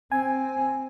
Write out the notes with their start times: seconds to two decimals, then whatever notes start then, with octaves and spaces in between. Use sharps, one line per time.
0.12 C4 G#5